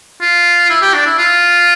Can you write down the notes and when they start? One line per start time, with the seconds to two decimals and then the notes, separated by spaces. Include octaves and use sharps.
0.21 F4
0.69 E4
0.81 G4
0.94 D4
1.06 E4
1.18 F4